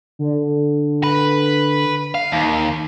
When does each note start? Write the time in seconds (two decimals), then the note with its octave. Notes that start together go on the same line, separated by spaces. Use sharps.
0.19 D3
1.04 B4
2.15 F5
2.32 D#2 D#3